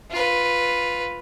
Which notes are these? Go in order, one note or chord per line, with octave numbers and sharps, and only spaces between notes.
F4 B4